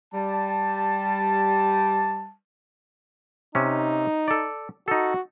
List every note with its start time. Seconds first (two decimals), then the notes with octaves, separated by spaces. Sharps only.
0.14 G3 A5
3.55 C3 C#4 D#4
4.28 A4 D5
4.88 D#4 F#4 A4